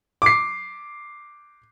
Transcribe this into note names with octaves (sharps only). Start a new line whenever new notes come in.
D6 C7